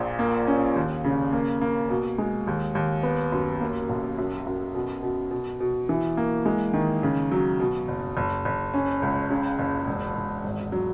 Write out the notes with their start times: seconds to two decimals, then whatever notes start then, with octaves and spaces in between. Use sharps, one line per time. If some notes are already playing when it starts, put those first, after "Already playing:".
Already playing: A#1 A#2
0.19 A#3
0.47 C#4
0.76 D#2
1.04 C#3
1.33 A#3
1.61 A#3
1.89 B2
2.18 G#3
2.47 D#2
2.75 D#2
3.03 B3
3.32 F#2
3.61 A#3
3.89 B1
4.18 F#2
4.46 F#2
4.75 B2
5.03 B2
5.31 B2
5.60 B2
5.89 E3
6.17 A#3
6.46 G#3
6.73 D#3
7.03 C#3
7.32 F#3
7.60 B2
7.88 F#1
8.17 F#1
8.45 F#1
8.74 C#4
9.02 C#2
9.30 C#3
9.59 F#1
9.87 E1
10.15 E1
10.44 G#1
10.72 F#3